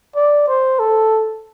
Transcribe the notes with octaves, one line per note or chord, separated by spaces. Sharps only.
D5
C5
A4